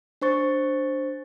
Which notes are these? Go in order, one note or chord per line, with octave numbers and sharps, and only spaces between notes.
D4 C5 C#6 A6